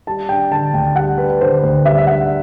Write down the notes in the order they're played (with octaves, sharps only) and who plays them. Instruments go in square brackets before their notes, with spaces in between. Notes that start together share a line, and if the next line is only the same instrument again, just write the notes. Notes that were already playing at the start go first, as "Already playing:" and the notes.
[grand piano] G3 A5
D4 G5
D3 A5
D2 G5
G3 F#5
D4 B4
D3 C5
B4
D2 C5
G3 E5
E5
D4 F#5